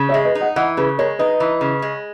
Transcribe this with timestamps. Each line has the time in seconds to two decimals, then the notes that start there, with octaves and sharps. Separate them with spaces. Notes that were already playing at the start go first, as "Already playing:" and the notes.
Already playing: C#3
0.09 C#5 E5
0.14 G#3
0.24 B4 D#5
0.35 D#4
0.41 D#5 F#5
0.56 E3 D#5 F#5
0.77 C#3 G#4 B4
0.98 G#3 A#4 C#5
1.19 D#4 B4 D#5
1.40 E3
1.61 C#3
1.82 G#3